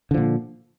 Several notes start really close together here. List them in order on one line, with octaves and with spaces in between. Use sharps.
D3 F3 A#2